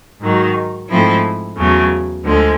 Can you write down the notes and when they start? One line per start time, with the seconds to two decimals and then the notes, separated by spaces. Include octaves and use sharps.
0.21 G#2 D#3 F#3
0.89 G#2 F3 A3 C4 E4
1.57 E2 C#3 F#3 A3
2.24 D2 D3 F3 G#3